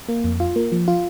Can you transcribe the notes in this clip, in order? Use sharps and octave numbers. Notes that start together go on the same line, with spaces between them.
A#3
F2
F4
A#3
F3
F4